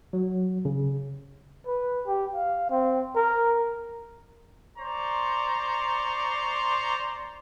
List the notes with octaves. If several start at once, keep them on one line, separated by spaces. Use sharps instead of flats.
F#3
C#3
B4
G4
F5
C4
A#4
C5 D5 A#5 C6 C#6